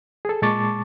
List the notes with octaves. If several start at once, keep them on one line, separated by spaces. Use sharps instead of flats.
G#4 A4
A#2 G#3 A5 C#6 D6 A6